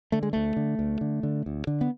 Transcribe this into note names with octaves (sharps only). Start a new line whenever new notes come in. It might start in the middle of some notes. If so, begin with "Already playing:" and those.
D3 A3
G#3
D2 A3
D3
D2
D3
D3
D2
D3
B3